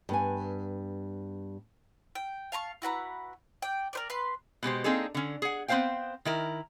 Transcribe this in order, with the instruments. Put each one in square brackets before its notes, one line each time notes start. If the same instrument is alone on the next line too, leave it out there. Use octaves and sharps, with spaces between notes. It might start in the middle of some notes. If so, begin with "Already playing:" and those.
[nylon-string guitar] G2 B3 G#5
[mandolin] G5
F5 A5 A#5 C#6
E4 F#4 B4 A#5
D5 G5
A#4 C5 D5
B4 C6
[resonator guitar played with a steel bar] B2 G#3 G4 C5
A#3 C4 D4 D#4 G#4 A4
D3 C#4
G#4 F#5
B3 C4 E4 C5 F5 G5
D#3 E4 A#4